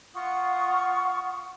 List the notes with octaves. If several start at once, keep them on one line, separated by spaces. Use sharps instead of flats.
F4 F#5 C#6 D#6